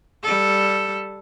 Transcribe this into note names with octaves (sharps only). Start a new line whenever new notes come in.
G3 A4